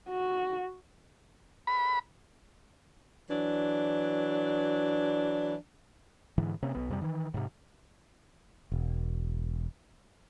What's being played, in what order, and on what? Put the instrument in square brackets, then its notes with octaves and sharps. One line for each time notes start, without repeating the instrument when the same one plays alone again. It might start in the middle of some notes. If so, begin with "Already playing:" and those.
[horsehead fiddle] F#4
[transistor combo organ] B5
[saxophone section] E3 F#3 D4
[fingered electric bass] G#2 D3 E3
C3 A#3 C4 C#4
B1 B3
F2 C3 E3 G3
D#3 E3
G#2 C3
[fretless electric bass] E1